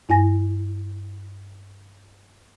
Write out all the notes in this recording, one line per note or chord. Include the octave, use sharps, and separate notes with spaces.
G2 E4 G#5 A#6